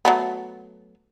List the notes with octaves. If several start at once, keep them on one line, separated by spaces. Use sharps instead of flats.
F#3 A3 B3